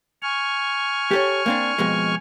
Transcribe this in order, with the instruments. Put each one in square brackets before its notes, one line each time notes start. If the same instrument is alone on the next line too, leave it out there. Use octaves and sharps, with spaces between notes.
[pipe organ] G#5 C#6 F6
[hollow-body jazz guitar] G4 A4 C#5
A#3 C4 D4
F2 B2 G#3